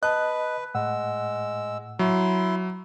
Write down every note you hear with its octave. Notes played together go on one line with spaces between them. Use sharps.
B4 D#5 A5 F#6
A2 G#3 F#5 E6
F#3 E4 C6